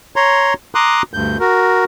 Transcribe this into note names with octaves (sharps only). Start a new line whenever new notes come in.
C#5 A#5 C6
A#5 C6 D6 D#6 F#6
D2 G2 G6
F#4 A#4